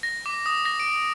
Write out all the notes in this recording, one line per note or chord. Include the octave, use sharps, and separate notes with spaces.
A#6
D6
D#6
A#6
D7